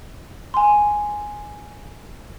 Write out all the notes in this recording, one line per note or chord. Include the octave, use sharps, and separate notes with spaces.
G#5 C6